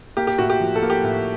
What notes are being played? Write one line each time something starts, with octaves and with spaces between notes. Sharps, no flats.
A#3 G4
G4
A2 F#4
G4
F3
A4
A#3
G4
A2